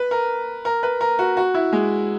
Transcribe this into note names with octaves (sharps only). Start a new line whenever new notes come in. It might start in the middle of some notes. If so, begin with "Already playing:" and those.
Already playing: B4
A#4
A#4
B4
A#4
F#4
F#4
E4
G#3